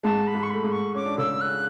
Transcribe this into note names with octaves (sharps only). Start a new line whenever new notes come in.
G#2 G#3 A5
B5
G#2 G#3
C#6
A3 B5
G#2 G#3
C#6
C#4 D6
D4
C#3 C#4 E6
F#6